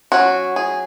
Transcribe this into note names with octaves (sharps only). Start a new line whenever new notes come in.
F#3 C#4 F#4
G#4